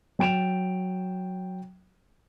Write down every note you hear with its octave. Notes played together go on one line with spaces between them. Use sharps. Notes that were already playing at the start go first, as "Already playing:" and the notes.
F#3 G5 D7 E7 F7